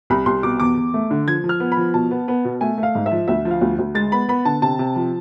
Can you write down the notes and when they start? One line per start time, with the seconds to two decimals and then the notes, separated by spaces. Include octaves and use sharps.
0.10 C2 B5
0.26 C2 C6
0.43 B2 D6
0.60 E2 D6
0.77 E2
0.94 A3
1.11 D3
1.27 F3 G#6
1.44 F3
1.49 F6
1.60 B3
1.72 B5
1.77 F3
1.94 B2 A5
2.11 B3
2.28 B3
2.45 B2
2.61 A3 G#5
2.78 A3
2.83 F5
2.95 G#2
3.06 E5
3.11 F3
3.28 D2 E5
3.45 F3
3.51 F5
3.62 D2
3.79 D2
3.95 G#3 A6
4.12 B3 B5
4.29 B3 B5
4.45 D3 A5
4.62 C3 A5
4.79 C3
4.96 F3